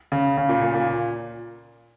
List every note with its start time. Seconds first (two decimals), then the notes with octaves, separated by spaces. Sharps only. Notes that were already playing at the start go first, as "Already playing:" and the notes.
0.12 C#3
0.38 C#3
0.49 A#2
0.62 A#2
0.74 A#2